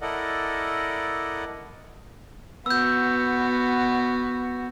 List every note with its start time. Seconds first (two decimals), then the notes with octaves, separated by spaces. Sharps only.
0.01 E4 A4 A#4 D5 D#5 F#5
2.66 B3 F#4 E6 G6